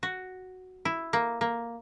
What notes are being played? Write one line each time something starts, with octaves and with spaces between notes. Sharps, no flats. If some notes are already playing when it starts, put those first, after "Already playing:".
F#4
E4
A#3
A#3